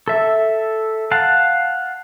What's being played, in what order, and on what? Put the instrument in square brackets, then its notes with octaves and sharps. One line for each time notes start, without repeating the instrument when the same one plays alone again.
[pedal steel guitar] A4 E5
F5 F#5 A5